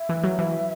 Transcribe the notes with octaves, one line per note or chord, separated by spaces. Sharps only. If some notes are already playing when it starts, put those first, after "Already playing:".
Already playing: E5
E3
F#3
E3